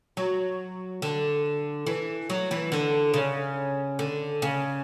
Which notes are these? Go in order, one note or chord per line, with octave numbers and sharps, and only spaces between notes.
F#3
D3
E3
F#3
E3
D3
C#3
D3
C#3